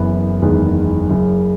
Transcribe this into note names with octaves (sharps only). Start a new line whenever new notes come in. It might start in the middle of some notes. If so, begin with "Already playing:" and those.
Already playing: F#1 F#2 E3 B3
F#1 E2 D#3 G#3 B3
F#1 F#2 C#3